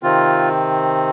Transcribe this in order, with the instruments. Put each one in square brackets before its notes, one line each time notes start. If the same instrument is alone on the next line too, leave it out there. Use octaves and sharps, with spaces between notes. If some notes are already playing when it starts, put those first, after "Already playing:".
[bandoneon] C3 D#3 C4 F4